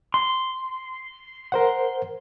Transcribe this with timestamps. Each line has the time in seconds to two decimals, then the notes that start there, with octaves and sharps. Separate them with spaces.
0.14 C6
1.52 A#4 C5 F#5